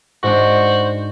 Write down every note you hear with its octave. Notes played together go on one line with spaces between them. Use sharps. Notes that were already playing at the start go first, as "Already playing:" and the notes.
G#2 D4 F#4 C5